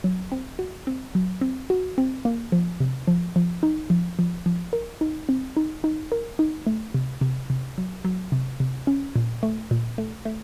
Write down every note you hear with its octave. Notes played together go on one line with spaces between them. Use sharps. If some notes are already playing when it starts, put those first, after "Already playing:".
F#3
C4
F#4
C4
F#3
C4
F#4
C4
A#3
F3
C3
F3
F3
D#4
F3
F3
F3
A#4
D#4
C4
D#4
D#4
A#4
D#4
A3
C3
C3
C3
F#3
F#3
C3
C3
C#4
A#2
A3
A#2
A3
A3